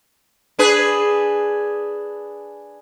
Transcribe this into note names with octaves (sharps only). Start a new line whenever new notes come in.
D4 G#4 B4